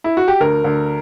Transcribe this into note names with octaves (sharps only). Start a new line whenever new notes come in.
E4
F#4
G4
D2 A#4
D2